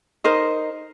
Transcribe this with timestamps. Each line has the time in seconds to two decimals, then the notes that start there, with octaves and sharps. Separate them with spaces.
0.24 D#4 A#4 C5 D#5